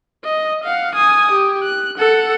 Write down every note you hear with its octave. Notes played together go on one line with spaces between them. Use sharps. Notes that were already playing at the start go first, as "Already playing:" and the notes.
D#5
F5 F#5
G#5 D#6
G4
F#6
A4 F#5